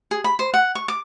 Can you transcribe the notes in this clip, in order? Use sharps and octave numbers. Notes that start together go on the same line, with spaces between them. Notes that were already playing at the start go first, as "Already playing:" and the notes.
G#4
B5
C5
F#5
C#6
D6